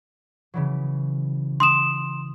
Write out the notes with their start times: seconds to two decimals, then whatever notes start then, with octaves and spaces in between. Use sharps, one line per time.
0.54 C#3 E3 F#3
1.60 C6 D#6 E7